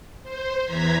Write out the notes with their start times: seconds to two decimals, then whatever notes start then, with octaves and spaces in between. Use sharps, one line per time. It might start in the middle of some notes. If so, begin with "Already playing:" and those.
0.23 C5
0.64 E2 E3 A#5 G#6 B6